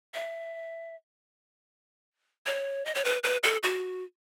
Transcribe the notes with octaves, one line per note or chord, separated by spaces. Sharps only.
E5
C#5
D#5
C#5
B4
B4
A4
F#4